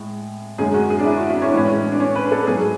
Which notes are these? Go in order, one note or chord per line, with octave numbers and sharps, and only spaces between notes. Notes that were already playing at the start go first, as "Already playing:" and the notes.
Already playing: A2 G#3
F#2 D3 G#3 G#4
F#4
G#4
D4
E4
F#4
E4
C#4
D4
A2 E3 G#3 C#4
D4
C#4
B4
A4
G#2 F#3 G#4